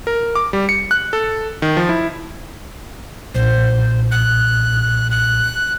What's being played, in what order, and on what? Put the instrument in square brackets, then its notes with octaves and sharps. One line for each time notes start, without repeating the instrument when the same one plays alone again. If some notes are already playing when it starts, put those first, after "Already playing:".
[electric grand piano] A#4
D6
G3
C#7
F#6
A4
D#3
F3
E4
[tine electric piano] B1 A#2 [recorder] C5
[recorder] F#6
F#6